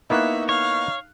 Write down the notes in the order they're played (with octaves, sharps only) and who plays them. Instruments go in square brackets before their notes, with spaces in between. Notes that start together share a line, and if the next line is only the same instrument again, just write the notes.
[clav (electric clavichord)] A#3 B3 E4 [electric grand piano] D#4 C#6 F#6 [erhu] E5
[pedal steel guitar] C#5 [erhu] F5